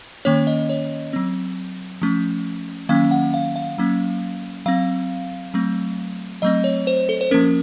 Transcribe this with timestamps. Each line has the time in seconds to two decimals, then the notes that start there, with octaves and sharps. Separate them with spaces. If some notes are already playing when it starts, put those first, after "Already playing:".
0.25 D#3 A#3 C#4 C#5
0.47 D#5
0.69 C#5
1.13 F#3 C4
2.02 F3 A3 C#4
2.89 D#3 F#3 A#3 C#4 F5
3.11 F#5
3.34 F5
3.56 F5
3.78 F#3 A#3 C#4
4.66 F#3 C4 F5
5.54 F#3 A3 C4
6.42 F#3 A3 C4 D#5
6.64 C#5
6.87 C5
7.09 A4
7.21 C5
7.31 F3 A#3 C#4 A#4